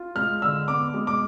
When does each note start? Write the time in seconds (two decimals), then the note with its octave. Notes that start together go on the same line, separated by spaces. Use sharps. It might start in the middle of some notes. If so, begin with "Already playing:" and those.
Already playing: F4
0.15 G#3 F6
0.42 D3 E6
0.68 B3 D6
0.94 G#3
1.07 D6